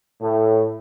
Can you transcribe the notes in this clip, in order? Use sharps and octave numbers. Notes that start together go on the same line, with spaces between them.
A2